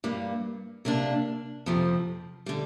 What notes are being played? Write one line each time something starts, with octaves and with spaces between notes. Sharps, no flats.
G2 G3 A#3
C3 A#3 D4
F2 C3 F3 C4
D3 G3